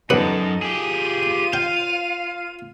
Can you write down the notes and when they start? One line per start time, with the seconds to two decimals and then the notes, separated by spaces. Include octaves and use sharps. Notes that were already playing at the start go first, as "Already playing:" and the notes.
0.10 F#2 G3 B3 D#4 A4 F#5
0.62 F4 G4 G#4 D#7
1.53 F5 G5